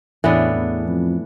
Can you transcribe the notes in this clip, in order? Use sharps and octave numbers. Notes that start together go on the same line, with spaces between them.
E2 A2 E3 B3 D4
E2
F2